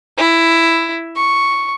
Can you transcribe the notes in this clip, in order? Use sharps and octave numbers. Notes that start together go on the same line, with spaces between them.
E4
C#6